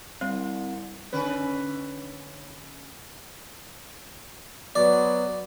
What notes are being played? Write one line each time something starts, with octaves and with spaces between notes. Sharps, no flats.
C2 G3 C4
D3 C#4 B4
F#3 B3 D5